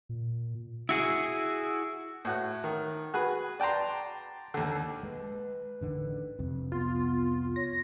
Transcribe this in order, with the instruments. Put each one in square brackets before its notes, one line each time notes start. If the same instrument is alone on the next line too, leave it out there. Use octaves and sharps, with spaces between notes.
[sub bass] A#2
[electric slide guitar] E4 F#4 G#4
[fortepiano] A2 F#4 F#6
D#3
F#4 G#4 B4
D5 G5 A5 A#5 C6
D#2 D3
[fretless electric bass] G#3 [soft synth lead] B4
[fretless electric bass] A1 D3 D#3
C2 F2 C3
[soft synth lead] B3 [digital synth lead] F4
[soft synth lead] C#5 [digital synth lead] A#6